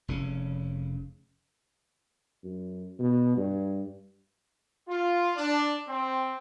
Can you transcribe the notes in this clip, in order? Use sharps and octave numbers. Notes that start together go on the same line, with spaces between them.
F1 C#3 C#4
F#2
B2
G2
F4
D4
C4